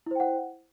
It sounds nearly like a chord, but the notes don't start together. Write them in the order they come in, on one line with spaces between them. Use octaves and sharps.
E4 C5 G5 F#5